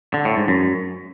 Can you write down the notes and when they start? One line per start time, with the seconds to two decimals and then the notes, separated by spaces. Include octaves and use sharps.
0.14 D3
0.25 A2
0.37 G#2
0.48 F#2